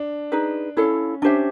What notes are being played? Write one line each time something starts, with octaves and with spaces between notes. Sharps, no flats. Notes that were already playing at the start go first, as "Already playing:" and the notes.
Already playing: D4
D#4 G#4 B4
C#4 E4 A4 C#5 F5
C#4 D4 G4 C5 E5